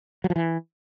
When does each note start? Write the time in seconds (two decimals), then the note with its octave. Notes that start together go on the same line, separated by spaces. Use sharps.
0.24 F#3
0.30 F3
0.36 E3